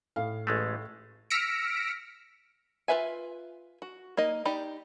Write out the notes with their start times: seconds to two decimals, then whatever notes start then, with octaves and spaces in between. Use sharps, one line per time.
0.16 A2 F5
0.47 A1 G#3 A3
1.30 E6 F6 A#6 B6 C#7 D7
2.88 F4 A4 B4 E5 G#5
3.82 F#4
4.17 A#3 D#4 D#5
4.45 D#4 G4 D5 B5